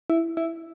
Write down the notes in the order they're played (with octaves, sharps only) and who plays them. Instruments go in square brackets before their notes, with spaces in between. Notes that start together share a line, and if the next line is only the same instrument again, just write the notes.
[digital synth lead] E4
E4